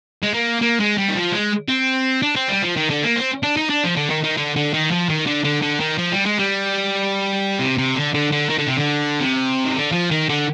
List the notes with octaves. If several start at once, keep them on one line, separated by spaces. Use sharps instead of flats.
G#3
A#3
A#3
G#3
G3
D#3
F3
G#3
C4
D4
C4
G3
F3
D#3
D3
A#3
C4
D4
D#4
D4
F3
D3
D#3
D#3
D3
D3
D#3
F3
D#3
D3
D3
D3
D#3
F3
G3
G#3
G3
C3
C3
D3
D3
D3
D#3
D3
C3
D3
C3
D#3
D3
F3
D#3
D3